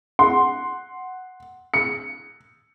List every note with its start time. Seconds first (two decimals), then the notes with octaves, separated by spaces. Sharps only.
0.19 F#5 C6
1.74 C#7